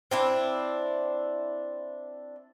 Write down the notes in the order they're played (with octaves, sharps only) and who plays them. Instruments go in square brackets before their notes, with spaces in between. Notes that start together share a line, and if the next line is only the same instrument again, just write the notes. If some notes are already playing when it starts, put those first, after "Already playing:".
[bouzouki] C4 D4 E4